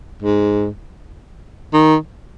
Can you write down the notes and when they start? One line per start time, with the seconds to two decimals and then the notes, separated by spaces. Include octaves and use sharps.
0.22 G#2
1.73 D#3